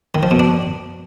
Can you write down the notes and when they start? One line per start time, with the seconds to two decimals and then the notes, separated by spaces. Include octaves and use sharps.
0.15 D#3
0.23 F3
0.31 B2
0.39 D4